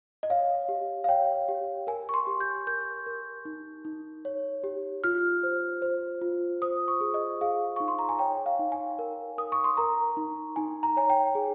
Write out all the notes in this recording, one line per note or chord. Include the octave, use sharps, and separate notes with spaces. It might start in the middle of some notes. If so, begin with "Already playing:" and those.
D#5
C#5 F5
G4
F5
C#5 G5
G4
A#4 G#5
C#6
C6
G4
G6
A#4 G6
A#4
D#4
D#4
C#5
G4
F4 F6
C5
C5
F4
C5 D#6
C#6
G#4
D#5
G#4 F5
D#4 C#6
C6
A#5
G#5
C#5 G5
F5
D#4
G#5
A#4
A#4 D#6
C#6
C6
A#4 A#5
D#4
D#4 G#5
A#5
C#5 G#5
G5
G#4